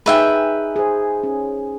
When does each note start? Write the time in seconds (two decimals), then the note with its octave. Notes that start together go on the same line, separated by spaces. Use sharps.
0.06 D#4 G#4 B4 E5 G5
0.76 G#4 C5
1.23 C#4